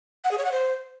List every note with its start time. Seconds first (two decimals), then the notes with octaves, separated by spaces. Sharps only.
0.24 F#5
0.31 G#4
0.38 C#5
0.45 F#5
0.52 C5